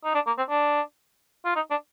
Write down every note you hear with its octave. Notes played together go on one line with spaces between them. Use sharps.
D#4
D4
A#3
C4
D4
F4
D#4
D4